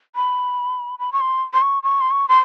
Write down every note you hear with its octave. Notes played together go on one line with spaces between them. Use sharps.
B5
B5
C#6
C6
C6
C#6
C#6
C6
C#6
C6